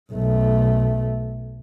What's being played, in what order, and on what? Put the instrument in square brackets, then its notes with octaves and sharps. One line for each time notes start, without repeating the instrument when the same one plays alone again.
[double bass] B1 A3